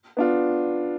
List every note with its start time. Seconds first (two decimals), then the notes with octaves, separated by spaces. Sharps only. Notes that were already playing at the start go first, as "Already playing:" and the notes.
0.17 B3 D4 F4